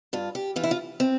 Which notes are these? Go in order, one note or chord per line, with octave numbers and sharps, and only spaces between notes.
G2 F4
G4
E3 F4
E4
F4
C4